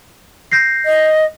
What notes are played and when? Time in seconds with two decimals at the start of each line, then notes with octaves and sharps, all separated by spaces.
0.52 G6 A#6 C7
0.85 D#5